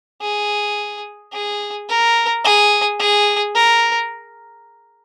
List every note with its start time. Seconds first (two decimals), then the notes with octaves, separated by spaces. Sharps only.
0.21 G#4
1.33 G#4
1.89 A#4
2.44 G#4
2.99 G#4
3.55 A#4